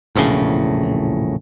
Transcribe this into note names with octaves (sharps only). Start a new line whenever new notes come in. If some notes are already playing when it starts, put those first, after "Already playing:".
E1 A#1 A2 C#3